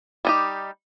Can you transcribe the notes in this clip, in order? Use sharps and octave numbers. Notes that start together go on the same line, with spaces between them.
G3 D#4 G4